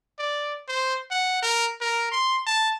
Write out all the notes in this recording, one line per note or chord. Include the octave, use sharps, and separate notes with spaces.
D5
C5
F#5
A#4
A#4
C6
A5